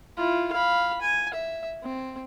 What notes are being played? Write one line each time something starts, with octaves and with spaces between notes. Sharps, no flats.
E4 F4
F5 B5
G#5
E5
C4